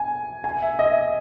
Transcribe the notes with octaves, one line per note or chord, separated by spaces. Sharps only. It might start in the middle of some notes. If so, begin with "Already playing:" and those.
Already playing: G#5
G#5
E5
D#5